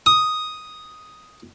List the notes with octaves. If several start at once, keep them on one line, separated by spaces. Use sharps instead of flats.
D#6